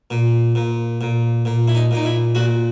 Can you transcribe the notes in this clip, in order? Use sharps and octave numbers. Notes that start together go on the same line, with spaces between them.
A#2
A#2
A#2
A#2
E4
D#4
A#2 D#4
E4
A#2 F#4